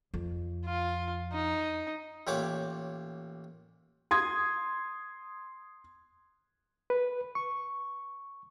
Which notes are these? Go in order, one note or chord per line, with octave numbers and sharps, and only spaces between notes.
F2
F4
D#4
A1 A#2 G4 C#5 F#5 D6
C6 D#6 G#6
B4
C#6